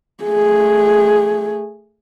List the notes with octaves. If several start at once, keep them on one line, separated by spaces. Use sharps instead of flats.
A3 G#4